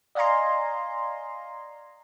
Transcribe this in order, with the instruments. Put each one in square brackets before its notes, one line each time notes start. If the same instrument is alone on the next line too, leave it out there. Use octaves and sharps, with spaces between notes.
[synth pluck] D5 D#5 F5 G#5 A#5 C6